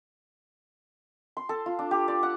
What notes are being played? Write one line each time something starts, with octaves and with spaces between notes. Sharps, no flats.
C6
A4
F4
D4
G4
D5
F#5